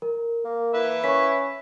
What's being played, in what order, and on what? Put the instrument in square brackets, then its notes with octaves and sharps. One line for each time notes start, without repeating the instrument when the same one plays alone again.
[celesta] A#4
[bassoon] A#3
[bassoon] A#3 [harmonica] B4 E5
[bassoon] C#4 [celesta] C#6 B6